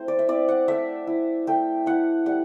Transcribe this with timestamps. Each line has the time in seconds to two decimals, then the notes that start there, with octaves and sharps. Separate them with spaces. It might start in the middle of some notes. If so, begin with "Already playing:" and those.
Already playing: A3 C4 E4 C5
0.08 D5
0.19 E5
0.28 C4 E4 D5
0.48 F#5
0.68 A3 E5
1.07 E4
1.47 A3 G5
1.86 E4 F#5
2.26 G3 F#5